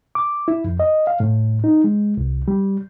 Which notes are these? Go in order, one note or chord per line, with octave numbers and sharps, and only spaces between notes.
D6
E4
F2
D#5
F5
A2
D#4
G#3
C2
G3